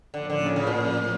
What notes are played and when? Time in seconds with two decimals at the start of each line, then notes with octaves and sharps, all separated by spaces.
0.14 A2 D3 F3 A#3 C#4
0.30 D3
0.46 C#3
0.56 C#3
0.67 A#2